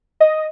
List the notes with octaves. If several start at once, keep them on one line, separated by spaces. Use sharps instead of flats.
D#5